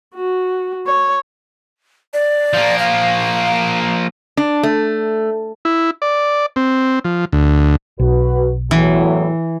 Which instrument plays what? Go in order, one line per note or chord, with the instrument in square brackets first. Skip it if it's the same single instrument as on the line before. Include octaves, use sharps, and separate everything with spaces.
[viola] F#4
C#5
[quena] D5
[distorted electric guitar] F3 A#3
[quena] F5
[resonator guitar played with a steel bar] D4
A3
[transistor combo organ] E4
D5
C4
F3
D2
[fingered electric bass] B1 [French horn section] F#4 B4
[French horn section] E2 A2 F#3 [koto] E3